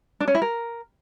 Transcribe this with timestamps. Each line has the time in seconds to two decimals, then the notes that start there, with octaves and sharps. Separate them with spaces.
0.20 D4
0.28 C#4
0.35 E4
0.42 A#4